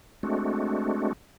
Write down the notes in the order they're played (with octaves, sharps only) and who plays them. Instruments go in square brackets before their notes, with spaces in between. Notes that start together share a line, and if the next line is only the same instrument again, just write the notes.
[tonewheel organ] G#3 A3 C4 D4 F#4